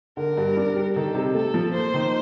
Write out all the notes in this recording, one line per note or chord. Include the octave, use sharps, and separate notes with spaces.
D3 A#4
G2
D4
G3
D#3 A4
C3
A3 A4
F3
A#3 C5
D#3